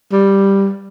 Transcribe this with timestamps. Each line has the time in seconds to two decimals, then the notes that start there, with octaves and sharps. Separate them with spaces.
0.12 G3